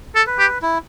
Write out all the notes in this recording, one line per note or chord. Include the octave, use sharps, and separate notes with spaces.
A4
B4
G4
E4